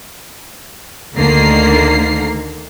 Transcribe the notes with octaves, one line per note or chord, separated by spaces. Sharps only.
D2 D3 D#3 A#3 A#5 C7